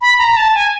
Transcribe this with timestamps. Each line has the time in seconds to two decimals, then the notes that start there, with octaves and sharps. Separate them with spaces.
0.01 B5
0.19 A#5
0.32 A#5
0.36 A5
0.55 G#5